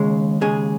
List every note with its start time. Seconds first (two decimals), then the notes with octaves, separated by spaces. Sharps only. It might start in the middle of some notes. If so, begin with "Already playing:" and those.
Already playing: D#2 C#3 G#3
0.41 D#2 C#3 G#3 G#4